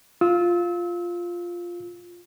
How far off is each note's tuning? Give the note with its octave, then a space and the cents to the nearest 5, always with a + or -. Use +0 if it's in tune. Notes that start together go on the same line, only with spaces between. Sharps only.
F4 +0 E6 -30